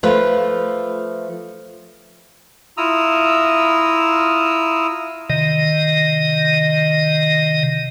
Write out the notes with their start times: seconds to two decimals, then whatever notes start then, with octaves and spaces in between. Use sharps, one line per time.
0.03 F3 A3 F4 B4
2.77 E4 F4 A#5 D#6 E6
5.30 C3 D#3 D#5